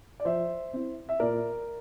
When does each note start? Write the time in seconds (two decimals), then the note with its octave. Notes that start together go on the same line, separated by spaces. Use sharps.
0.20 D5
0.25 F3 C5 E5
0.73 C4 E4
1.09 E5
1.20 A#2 A#4 D5